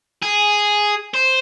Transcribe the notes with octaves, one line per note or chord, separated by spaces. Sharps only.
G#4
C5